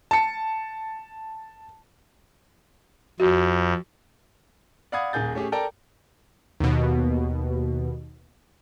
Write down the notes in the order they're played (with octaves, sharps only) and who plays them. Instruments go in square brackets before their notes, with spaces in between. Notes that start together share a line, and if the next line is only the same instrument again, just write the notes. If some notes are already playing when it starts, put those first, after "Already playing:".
[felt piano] A5 C#7
[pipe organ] F2 [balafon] F#4
[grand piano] D5 F5 F#5 B5 D#6 G#6
D#1 A#3 G#4 G6 A6
A3 C#4 G4 G#4
A4 A#4 D5 G5 A5 A#5
[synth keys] D#2 B2